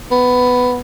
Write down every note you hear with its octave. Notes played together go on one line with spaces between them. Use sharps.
B3